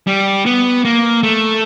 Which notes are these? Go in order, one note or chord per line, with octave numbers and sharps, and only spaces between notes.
G3
B3
A#3
A3